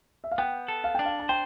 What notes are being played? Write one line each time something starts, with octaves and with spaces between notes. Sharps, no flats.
E5
F5
B3 G5
A4
F5
D4 G5
F5
A5
C5 G5